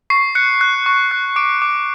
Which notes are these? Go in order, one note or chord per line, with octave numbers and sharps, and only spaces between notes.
C#6 C7
F#6 C#7
F#6
C#6
F#6
D6 D7
D6